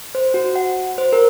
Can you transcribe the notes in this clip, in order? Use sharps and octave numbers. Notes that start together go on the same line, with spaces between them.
C5
F#4
F#5
C5
A#4